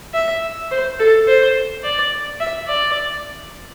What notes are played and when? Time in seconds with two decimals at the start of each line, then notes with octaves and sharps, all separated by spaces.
0.14 E5
0.71 C5
0.99 A4
1.27 C5
1.83 D5
2.40 E5
2.67 D5